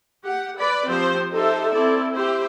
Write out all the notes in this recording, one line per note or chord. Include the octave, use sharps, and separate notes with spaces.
G4 F#5
B4 D5 B5
F3 C4 G4 C5
D#4 G4 A4 C5 E5
C4 E4 A4 D5
E4 G4 C5